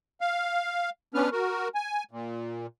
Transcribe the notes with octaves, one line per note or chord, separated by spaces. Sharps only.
F5
B3 C#4 D4 B4 F6
F#4 A#4
G#5
A#2